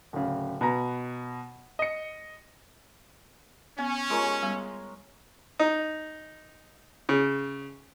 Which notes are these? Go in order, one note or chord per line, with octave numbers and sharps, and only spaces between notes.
D1 C#3
B2 B4 A#5
D#5 C#7
B3 C#4
G#3 F4 A#4 C#5
G3 B3
D#4
C#3